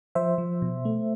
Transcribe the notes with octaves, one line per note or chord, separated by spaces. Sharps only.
F3 C5 E5
F3
B2
A3